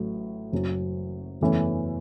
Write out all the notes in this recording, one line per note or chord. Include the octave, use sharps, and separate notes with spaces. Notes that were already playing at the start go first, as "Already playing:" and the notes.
Already playing: A1 A2 F#3
F#1 F#2 F#3 C#4
F#1 E2 E3 A3 C#4